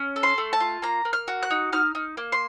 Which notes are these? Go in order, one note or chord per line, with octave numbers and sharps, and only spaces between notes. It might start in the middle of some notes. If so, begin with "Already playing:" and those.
Already playing: C#4
A4
C6
A3
A5
F4
A#3 A#5
A#3
F6
F#4
F#6
D#4
D#4 F6
D#4
A#3
C6